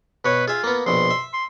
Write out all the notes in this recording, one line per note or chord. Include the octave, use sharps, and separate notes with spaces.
B2 B4 C#5
F4 G#4 E5
A#3 B3
A#1 B2 C6
E5
C6